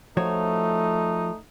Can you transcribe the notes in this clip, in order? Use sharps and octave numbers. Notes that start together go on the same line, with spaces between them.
F3 A3 D#4 F#4 C#5